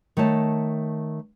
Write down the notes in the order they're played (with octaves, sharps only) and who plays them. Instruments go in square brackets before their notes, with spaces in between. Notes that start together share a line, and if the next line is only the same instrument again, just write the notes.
[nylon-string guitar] D#3 A3 C#5 A5